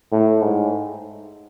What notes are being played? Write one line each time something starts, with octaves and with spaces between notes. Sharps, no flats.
A2
G#2